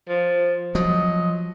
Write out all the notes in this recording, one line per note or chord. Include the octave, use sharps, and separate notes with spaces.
F3
F3 F#3 D#5